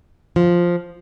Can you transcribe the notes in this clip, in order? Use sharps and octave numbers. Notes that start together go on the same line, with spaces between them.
F3